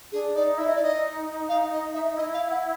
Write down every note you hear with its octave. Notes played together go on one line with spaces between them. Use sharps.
D4 G#4
D#4 D5
E4 E5
D#5
D5
D#4 D#5
F5
D#5
E5
E4 D#5
F5
F#5